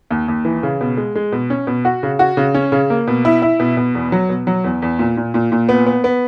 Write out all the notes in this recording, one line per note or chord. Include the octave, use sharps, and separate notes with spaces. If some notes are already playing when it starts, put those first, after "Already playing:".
D#2
D#2
E3
C#3
B2
G#3
G#3
B2
C#4
B2
F#4
C#3
F#4
C#3
C#4
C#3
A#3
B2
E4
E4
B2
B2
E2
F#3
B2
F#3
E2
E2
A#2
A#2
A#2
A#2
B3
B3
B3